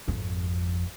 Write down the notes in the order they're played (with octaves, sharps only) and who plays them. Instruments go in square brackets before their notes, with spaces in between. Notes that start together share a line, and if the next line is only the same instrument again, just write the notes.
[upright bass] G#1 F2